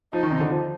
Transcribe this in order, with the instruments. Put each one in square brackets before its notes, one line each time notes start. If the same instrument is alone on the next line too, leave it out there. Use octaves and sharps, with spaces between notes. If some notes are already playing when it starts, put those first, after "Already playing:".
[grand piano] F3 [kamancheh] D#4
[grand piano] D#3
C3
D3
F3